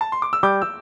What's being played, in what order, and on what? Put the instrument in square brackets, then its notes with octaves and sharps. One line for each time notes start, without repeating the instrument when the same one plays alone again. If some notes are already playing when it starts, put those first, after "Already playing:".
[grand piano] A5
C6
D6
E6
[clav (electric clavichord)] G3 [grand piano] D6 G6
[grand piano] E6